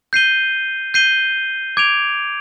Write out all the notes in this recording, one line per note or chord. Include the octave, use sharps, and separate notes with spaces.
G6 C7 D#7 G7
G6 C7 D#7 G7
D6 G#6 D7 F7